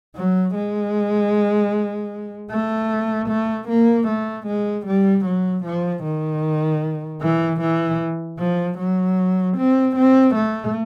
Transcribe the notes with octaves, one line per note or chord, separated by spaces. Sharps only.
F#3
G#3
A3
A3
A#3
A3
G#3
G3
F#3
F3
D#3
E3
E3
F3
F#3
C4
C4
A3